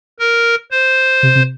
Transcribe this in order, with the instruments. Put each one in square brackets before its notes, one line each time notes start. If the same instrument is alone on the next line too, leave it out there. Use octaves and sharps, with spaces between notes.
[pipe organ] A#4
C5
[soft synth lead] C3
C3